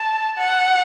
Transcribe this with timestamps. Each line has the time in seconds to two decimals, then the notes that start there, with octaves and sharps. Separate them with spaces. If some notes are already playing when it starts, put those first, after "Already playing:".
Already playing: A5
0.37 F#5